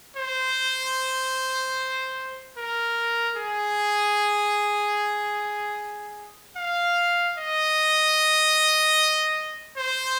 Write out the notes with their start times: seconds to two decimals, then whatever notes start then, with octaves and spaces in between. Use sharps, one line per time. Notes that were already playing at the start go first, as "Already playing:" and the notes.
0.17 C5
2.57 A#4
3.37 G#4
6.56 F5
7.38 D#5
9.78 C5